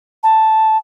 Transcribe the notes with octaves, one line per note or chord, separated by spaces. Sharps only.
A5